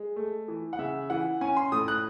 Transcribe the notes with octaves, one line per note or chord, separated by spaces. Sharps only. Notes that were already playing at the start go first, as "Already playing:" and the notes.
Already playing: G#3
A3
E3
F#5
C#3 E5
E3 F#5
C#4 G#5
C6
A2 D#6
F#6